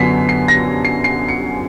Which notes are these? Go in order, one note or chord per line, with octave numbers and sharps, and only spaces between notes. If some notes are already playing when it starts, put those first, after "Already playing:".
Already playing: F#2 D3 F#3 B3 B6 C7
C7
A#6
C7
C7
C#7